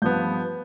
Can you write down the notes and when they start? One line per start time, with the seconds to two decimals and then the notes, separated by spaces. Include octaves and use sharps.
0.02 G2 F3 B3 G6